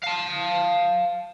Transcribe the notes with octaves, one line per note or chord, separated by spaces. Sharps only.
F5 A5